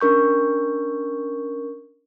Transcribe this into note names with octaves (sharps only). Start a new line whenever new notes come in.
C#4 D4 A#4 C#6 G6